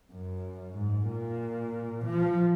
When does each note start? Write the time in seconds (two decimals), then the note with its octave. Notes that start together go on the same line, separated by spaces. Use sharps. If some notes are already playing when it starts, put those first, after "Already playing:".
0.12 F#2
0.76 G#2
1.08 A#2
2.05 F3